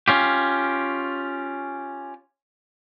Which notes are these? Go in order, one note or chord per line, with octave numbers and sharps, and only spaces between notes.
C#4 F4 G4